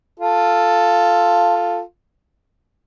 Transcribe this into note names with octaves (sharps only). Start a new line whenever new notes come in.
F4 A4